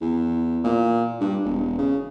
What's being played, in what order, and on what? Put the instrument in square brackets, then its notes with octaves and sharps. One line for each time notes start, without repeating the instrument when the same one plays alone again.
[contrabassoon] E2
A#2
G2
E1
C#3